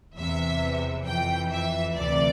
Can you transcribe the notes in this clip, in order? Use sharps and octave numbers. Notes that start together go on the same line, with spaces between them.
E2 C3 E3 E5
F2 E3 G5
E5
D2 C3 E3 D5